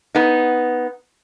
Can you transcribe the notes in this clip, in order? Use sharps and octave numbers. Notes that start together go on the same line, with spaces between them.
B3 D#4